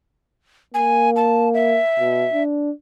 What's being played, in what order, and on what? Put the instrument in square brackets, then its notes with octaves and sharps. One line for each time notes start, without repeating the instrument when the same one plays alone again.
[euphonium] A#3 [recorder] G#5
[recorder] A5
E5
[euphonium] B2
D4